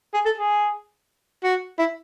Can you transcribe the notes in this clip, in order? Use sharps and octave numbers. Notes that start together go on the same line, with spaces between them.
G#4
A4
G#4
F#4
E4